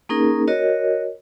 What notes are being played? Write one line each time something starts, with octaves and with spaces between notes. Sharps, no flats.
A#3 C#4 D#4 G#4 A#4
F#4 A#4 C#5 D#5